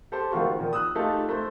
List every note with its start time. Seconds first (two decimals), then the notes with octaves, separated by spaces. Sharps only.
0.12 G4 A4 C5
0.32 F#1 D#3 A3 F4 F#4 C#6
0.59 A#2 D#3
0.73 D#6 E6 F#6
0.95 A3 D#4 F4 G4 A4
1.29 A3 C5